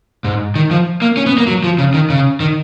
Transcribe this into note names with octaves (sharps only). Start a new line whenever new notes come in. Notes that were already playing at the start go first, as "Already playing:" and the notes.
G#2
D#3
F3
A#3
C#4
B3
A#3
F#3
F3
C#3
D#3
C#3
D#3